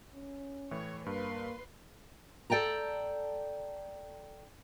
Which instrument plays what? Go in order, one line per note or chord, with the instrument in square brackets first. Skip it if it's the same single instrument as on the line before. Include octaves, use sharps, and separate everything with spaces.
[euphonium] C#4
[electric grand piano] A2 E3 [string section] C#5
[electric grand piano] G2 [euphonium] A#3 [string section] B4 C6
[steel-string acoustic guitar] A4 D5 G5 A5 A#5